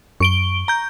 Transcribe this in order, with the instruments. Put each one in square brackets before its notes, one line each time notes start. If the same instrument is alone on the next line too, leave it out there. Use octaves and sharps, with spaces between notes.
[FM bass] F#2 [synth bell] C#6 D7 G7
[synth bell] A#5 G6